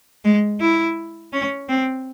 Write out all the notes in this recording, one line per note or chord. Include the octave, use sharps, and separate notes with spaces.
G#3
E4
C#4
C4